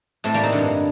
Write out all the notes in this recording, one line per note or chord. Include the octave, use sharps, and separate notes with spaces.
A2 A3 C4
G3 A#3
C4 D#4
D3
G2